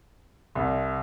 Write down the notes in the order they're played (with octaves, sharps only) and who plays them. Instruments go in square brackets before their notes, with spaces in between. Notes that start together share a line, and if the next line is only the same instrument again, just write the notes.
[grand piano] C2